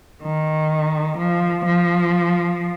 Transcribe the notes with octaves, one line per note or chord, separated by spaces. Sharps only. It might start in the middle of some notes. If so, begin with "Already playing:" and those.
D#3
F3
F3